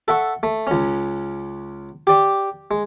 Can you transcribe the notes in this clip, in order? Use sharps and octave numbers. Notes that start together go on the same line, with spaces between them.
A4 E5 F#5 C#6
A3
C#2 C#4
G4 D5
G#3